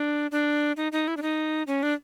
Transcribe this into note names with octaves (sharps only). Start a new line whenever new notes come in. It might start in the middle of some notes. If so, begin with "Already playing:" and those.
Already playing: D4
D4
D#4
D#4
E4
D4
D#4
C#4
D4